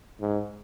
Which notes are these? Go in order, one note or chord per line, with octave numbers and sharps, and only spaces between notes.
G#2